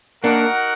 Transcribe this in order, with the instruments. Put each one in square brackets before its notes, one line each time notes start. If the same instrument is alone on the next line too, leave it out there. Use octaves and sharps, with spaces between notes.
[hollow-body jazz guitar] A#3 D4 [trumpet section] D#4 F#4 A#4 F#5